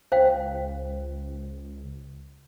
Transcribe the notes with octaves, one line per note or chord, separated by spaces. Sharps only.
C#2 C5 F5 G5